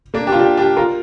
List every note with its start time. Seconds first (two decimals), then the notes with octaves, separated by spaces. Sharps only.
0.14 A#3 D4
0.27 D4 G4
0.32 F4
0.39 D4 G4
0.57 D4 G4
0.76 F4 A#4